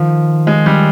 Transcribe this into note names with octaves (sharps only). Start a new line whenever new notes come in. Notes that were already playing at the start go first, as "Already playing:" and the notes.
Already playing: D#3 F3
G#3
G3